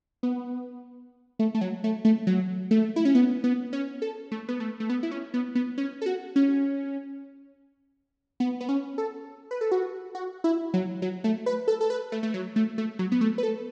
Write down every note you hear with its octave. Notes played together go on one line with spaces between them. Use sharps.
B3
A3
A3
F#3
A3
A3
F#3
A3
E4
C#4
B3
B3
C#4
A4
A3
B3
A3
A3
B3
E4
C#4
B3
B3
C#4
A4
F#4
C#4
B3
B3
C#4
A4
B4
A4
F#4
F#4
E4
F#3
F#3
A3
B4
A4
A4
B4
A3
A3
F#3
A3
A3
F#3
B3
A3
B4
A4